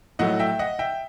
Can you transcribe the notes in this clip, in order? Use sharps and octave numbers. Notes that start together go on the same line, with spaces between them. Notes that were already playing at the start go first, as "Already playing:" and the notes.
A2 F#3 A3 D#5 F#5
E5 G5
D#5 F#5
E5 G5